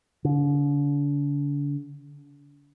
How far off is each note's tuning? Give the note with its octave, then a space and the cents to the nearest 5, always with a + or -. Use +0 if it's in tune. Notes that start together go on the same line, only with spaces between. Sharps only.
D3 -40